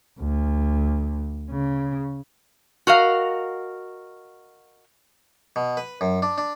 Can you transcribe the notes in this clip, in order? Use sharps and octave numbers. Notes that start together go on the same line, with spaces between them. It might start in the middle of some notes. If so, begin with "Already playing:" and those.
D2
C#3
F#4 A#4 D#5 F5
B2
B4
F#2
D4
D4